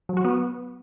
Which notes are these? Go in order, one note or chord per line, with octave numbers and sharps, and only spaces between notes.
F#3
F#4
B3